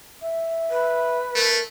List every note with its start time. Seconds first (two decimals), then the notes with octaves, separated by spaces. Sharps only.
0.22 E5
0.70 B4
1.35 A3 A#4